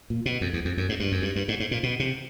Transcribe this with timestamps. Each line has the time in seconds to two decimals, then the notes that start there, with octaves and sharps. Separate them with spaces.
0.10 A#2
0.26 B2
0.41 F2
0.53 E2
0.65 F2
0.77 F#2
0.89 G#2
1.00 G2
1.12 F#2
1.22 G2
1.36 G2
1.48 G#2
1.60 G#2
1.71 A#2
1.83 B2
2.00 C3